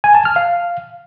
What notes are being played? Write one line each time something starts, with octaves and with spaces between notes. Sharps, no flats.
G#5
A5
F6
F5